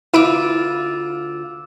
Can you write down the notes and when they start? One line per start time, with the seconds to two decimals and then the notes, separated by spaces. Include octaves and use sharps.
0.14 D2 E4 F4 B4 D6 E6 D7 E7